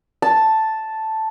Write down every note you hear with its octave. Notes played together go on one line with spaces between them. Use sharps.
A5